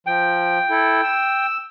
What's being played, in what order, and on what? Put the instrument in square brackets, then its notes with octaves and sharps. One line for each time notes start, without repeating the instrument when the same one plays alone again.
[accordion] F3 [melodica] G5
[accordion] E4 A4
E6